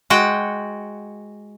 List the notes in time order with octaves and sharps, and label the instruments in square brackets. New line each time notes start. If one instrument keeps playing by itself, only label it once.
[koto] G#3 F#4 F#5 G5